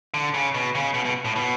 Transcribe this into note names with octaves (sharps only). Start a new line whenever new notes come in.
D3
C#3
B2
C#3
B2
B2
A2
B2